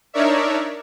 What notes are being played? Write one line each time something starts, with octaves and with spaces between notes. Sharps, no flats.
D4 D#4 A#4 C#5 D5 E5